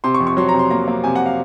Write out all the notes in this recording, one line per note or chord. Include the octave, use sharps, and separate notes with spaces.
C3 C6
C#6
F2
C#6
F#3 C6
A#5
C3
C6
A#3 A#5
A#3
C3 G#5
F#5
F5